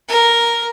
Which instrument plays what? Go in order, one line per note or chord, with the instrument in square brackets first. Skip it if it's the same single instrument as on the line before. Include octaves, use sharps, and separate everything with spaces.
[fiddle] A#4